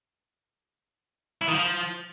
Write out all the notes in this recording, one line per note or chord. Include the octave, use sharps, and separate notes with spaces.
E4
D#3
F3